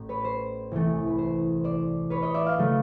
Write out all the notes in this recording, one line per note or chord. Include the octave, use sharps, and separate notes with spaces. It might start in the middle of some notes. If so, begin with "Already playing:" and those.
Already playing: A1
B4 C#5
C5
C2 C3 E3 A3
B4
C5
C5 D5
B4 C#5
C#5 D#5
D5 E5
D#5 F5
C#3 F#3 A3